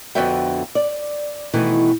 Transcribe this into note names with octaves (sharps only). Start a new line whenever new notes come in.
F2 D3 B3 F#4 E5 G5
D5
B2 D#3 E3 A3